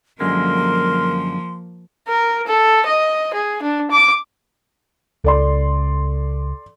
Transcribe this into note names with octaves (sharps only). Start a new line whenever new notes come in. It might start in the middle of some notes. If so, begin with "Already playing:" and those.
F#2 D3 F3 G#3 A#3 A#4 C6
A#4
A4
D#5
G#4
D4
D6
C#2 A4 D5 C6